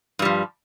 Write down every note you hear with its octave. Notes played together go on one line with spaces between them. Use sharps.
G2 F3 G3